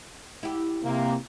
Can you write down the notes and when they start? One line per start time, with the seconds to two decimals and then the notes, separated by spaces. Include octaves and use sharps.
0.43 E4 G4
0.83 C3 A#3